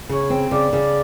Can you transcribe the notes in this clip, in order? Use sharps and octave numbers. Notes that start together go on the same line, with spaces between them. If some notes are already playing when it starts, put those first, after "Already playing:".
C#3 C#5
C4
C#3 D5
C#3